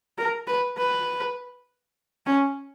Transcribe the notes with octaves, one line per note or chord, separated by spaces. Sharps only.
A#4
B4
B4
C#4